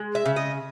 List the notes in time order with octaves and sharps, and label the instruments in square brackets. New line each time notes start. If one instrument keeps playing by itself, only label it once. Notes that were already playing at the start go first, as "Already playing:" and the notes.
Already playing: [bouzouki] G#3
E5
C#3
D#5